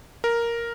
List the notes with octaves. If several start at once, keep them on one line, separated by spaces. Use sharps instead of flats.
A#4